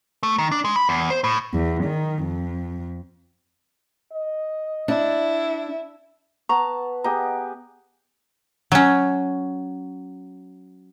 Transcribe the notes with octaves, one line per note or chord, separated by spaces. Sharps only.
A3
D#3
D4
G#3
B5
E2
C5
A2
E2
D#3
F2
D#5
D4 E4
B3 A5 A#5 C#6
B3 G4 G#4 D#5 A#5
F#3 C#4